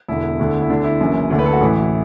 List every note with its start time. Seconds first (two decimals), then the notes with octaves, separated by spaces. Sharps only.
0.08 E1 E2 D3 E4
0.39 D2 D3
0.62 E4
0.70 D2 D3 D4
0.84 E4
1.00 F#1 F#2 E3
1.30 D2 D3
1.39 B4
1.46 A4
1.53 F#4
1.61 A1 A2 E3 E4